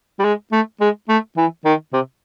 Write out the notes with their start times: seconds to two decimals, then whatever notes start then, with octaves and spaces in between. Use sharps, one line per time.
0.19 G3
0.24 G#3
0.52 A3
0.81 G#3
1.09 A3
1.37 E3
1.65 D#3
1.93 C3